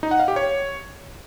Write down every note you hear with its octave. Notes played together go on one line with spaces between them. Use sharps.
D#4
F#5
F5
G4
C#5